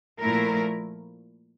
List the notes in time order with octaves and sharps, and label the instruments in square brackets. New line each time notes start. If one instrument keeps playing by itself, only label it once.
[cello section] A#2 F3 A3 E4 A#4